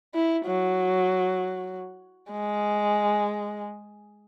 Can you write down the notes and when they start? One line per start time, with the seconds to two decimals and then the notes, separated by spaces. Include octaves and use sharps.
0.15 E4
0.46 F#3
2.32 G#3